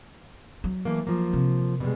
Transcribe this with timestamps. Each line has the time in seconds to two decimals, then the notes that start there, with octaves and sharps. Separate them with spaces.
0.64 F#3
0.85 E3 A3 A#3
1.07 F3 A#3
1.33 C3
1.80 B2 G3 G#3